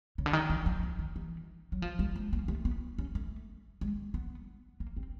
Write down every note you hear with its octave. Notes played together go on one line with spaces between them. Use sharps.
C#3
D3
D#3
E3
F3
F3
D#3
E3
F#3
F3
G3
G#3
A#3
A3
B3
C#4
A3
G#3
B3
A#3
C4